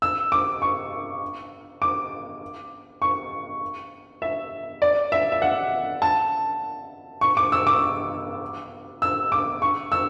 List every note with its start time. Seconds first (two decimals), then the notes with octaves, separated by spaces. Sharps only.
0.02 E6
0.32 D6
0.62 C#6
1.82 D6
3.02 C#6
4.22 E5
4.82 D5
5.12 E5
5.32 E5
5.42 F#5
6.02 A5
7.21 C#6
7.37 D6
7.52 E6
7.67 D6
9.02 E6
9.32 D6
9.62 C#6
9.92 E6